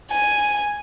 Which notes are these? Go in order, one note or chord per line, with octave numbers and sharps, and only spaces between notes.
G#5